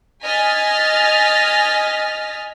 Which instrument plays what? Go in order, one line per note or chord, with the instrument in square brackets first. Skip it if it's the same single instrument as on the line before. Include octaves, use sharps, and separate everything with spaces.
[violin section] D#5 G#5 F6 A6 B6